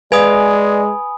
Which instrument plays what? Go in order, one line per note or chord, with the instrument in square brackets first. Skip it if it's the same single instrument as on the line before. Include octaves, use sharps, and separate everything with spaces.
[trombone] G#3 [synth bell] B4 [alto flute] D5 [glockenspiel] G#5 B5 D#6